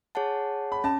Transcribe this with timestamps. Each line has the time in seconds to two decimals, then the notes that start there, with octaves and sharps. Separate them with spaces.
0.15 G#4 C#5 F#5 A5
0.72 B5
0.84 C#4 A5